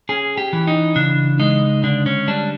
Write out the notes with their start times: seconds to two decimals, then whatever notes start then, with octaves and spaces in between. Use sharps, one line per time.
0.09 C#4 G#4
0.38 G4
0.53 E3
0.67 D#4
0.96 C#3 D4
1.40 G#3 D#4
1.84 D3 D4
2.06 C#4
2.28 G3 D4